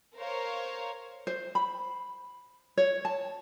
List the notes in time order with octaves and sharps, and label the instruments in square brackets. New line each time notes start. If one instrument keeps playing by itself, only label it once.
[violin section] A#4 C5 C#5 F5
[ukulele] C5
B5
C#5
A5